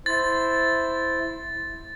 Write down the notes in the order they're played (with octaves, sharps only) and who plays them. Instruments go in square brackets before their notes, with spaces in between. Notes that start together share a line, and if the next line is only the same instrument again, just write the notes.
[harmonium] E4 C5 [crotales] A6